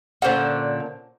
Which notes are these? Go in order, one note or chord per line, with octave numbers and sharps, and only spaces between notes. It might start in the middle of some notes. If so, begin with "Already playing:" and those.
A#2 D3 C#4 C5 F#5